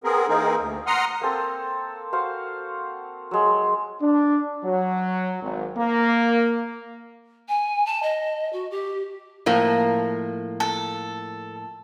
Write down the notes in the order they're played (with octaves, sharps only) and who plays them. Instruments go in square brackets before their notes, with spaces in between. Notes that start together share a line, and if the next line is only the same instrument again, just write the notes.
[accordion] B3 C4 G#4 A#4
E3 A#3 C4 D#4 G#4 A#4
D2
F#5 A#5 C6 D#6 F6
[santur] A#3 C4 A4
F#4 C5 F5
F#3 G#3
[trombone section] D4
F#3
G#1
A#3
[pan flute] G#5
A5
D#5
F#4
G4
[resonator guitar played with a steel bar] A2 F3 A#3
[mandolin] A4